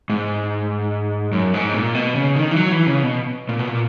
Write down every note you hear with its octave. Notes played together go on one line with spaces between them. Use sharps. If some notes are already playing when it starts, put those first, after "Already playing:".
G#2
F#2
G#2
A#2
B2
C#3
D#3
E3
F#3
E3
C#3
B2
A#2
B2
A#2